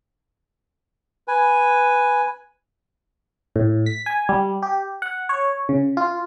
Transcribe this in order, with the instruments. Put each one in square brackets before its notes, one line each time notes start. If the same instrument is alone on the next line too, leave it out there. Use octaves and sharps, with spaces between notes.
[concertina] B4 G#5
[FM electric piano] A2
B6
G#5
G3
G4
F#5
C#5
C#3
F4